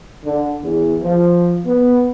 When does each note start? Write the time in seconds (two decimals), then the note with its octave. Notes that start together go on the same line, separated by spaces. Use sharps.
0.25 D3
0.63 E2
1.01 F3
1.66 B3